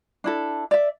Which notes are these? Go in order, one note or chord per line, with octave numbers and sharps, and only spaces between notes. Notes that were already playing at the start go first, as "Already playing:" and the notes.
D4 E4 A4
D5 E5